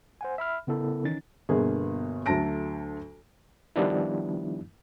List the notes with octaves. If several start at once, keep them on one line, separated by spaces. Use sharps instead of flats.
C5 F#5 G#5
E5 B5 F6
C#3 B3 E4 A4 A#4
D#3 E3 C#4 D#4 A6
G1 G2 B2 D3 A#3 G#4
D2 F#3 A3 A5 A#6 D7
D#3 F3 G3 B3 D4 E4